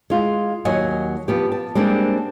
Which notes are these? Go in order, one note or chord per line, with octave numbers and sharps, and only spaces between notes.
G#3 F4
D#2 F#3 D#5 F#5 G#5
F3 B3 G4
A5
G3 G#3 A#3 C4 D4 G4